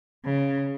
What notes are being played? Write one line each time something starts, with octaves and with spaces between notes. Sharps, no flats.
C#3